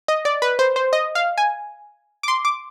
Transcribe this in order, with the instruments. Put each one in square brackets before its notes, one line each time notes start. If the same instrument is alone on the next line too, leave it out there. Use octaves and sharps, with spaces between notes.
[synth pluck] D#5
D5
B4
C5
C5
D#5
F5
G#5
D6
C6
D6